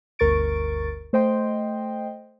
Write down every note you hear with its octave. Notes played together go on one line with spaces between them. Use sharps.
G1 D2 A#4 C#6 A6 D7
A3 C5 D#5 G5 C6